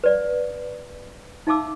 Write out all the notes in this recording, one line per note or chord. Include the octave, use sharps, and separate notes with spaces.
B4 D5 F5
D#4 E5 F5 A5 D6 E6